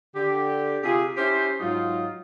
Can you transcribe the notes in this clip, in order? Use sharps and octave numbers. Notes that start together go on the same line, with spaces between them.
D3 G4
C3 F4 G4 G#4
C#4 E4 G4 C5
G#2 F#3 D#4 F4